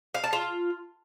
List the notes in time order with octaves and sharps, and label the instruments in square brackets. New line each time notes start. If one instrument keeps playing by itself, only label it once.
[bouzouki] F5
A5
F4